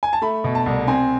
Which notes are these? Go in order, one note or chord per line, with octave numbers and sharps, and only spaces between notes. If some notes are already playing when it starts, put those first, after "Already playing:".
G#5
A5
A3 B5
B2
A5
C2
C4 G#5